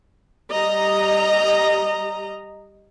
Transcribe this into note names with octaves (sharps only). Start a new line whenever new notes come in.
G3 D#5 A#5